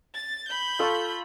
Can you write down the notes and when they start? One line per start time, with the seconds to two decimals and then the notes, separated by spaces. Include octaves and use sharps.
0.14 A6
0.48 B5 G6
0.79 F4 A4 C#6